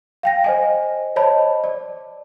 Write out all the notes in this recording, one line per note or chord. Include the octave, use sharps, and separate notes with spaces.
F5 G5 A#6
C5 D#5 G#5
C5 C#5 D#5 A5 B5
D5